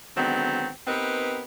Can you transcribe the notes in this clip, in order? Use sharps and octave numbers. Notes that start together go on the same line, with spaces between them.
D3 D#3 F#3 G#3 B3 C4
B3 C4 D#4 G4 A#4 B4